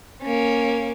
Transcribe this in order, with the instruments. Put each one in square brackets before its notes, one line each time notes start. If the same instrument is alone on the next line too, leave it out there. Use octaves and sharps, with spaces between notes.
[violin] A#3 C#4